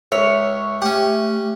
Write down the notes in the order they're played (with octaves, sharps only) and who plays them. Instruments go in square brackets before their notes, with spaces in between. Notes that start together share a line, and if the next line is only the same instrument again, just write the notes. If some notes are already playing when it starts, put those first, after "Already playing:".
[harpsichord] C#2 [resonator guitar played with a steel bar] C#5 [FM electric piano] E5
[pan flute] A3 [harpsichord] C#4 F#5 [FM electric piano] G4